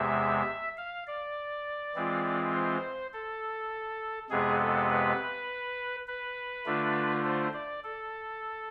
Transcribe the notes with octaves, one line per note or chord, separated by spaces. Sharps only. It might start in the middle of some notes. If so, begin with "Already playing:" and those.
Already playing: E2 C3 G#3 E5
F5
D5
E3 G#3 C4 F4
C5
A4
F2 C3 G#3 B3 G#4
A4
B4
B4
D3 A3 D4 F4
C5
D5
A4